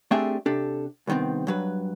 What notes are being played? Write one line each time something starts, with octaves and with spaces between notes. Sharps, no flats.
A3 C4 D4 G4 G#4 E5
C3 D4 G4 A4
C2 G2 D#3 B3 C4
G2 F#3 B4